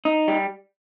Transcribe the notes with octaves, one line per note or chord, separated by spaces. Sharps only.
D#4
G3